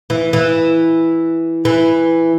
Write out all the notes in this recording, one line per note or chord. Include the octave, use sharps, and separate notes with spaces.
E3
E3
E3